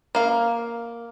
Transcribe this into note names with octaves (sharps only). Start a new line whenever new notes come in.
A#3 F5